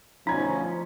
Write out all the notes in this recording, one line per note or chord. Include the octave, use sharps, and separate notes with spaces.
D2 B2 F3 C#4 D#4 A#5 G#6